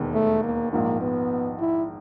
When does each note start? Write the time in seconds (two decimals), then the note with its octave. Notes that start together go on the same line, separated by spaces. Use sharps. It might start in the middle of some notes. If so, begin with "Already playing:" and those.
Already playing: E1 D#2 D#3 G#3 B3
0.14 A3
0.43 A#3
0.72 A#1 G#2 F3 A#3
1.01 B3
1.59 E4